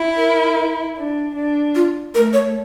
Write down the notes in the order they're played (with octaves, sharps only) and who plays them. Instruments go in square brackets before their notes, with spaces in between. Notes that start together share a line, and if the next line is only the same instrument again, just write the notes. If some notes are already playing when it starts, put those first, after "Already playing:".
Already playing: [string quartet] E4
[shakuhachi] A#4
[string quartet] D4
D4
[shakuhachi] F4
[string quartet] A3 [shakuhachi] A#4
[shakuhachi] C#5